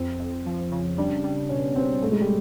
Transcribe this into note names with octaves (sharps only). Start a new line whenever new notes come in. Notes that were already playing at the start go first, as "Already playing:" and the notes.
Already playing: F2 C4
F2
F3
C#3
G3 D4
G3
B2 C#4
B2 C4
G#2 A3
G#3
G3